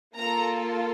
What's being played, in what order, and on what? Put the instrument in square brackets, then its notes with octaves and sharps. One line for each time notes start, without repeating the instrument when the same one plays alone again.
[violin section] A#3 F4 A4 A#5